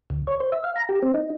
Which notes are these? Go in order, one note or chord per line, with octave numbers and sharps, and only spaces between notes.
D2
C#5
C5
E5
F5
A#5
G4
C4
D#4